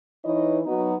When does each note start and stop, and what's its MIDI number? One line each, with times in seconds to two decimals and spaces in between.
0.25 0.60 52
0.25 0.60 63
0.25 0.60 64
0.25 0.60 71
0.25 0.60 73
0.25 0.60 75
0.66 0.96 54
0.66 0.96 59
0.66 0.96 63